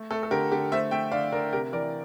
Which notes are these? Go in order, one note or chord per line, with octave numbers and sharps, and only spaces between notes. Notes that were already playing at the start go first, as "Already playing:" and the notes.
Already playing: A3
A3 A4
A4
D3 G4 A#4
D3 G4
A3 C5 E5
A3 E5 G5
D3 D5 F5
D3 A#4 D5
C3 G4 A#4
E3 A#4 D5